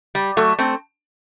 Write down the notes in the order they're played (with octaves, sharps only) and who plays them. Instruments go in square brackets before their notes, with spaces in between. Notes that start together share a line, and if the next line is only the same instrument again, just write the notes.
[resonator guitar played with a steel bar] G3
F#3 A3
A3 C4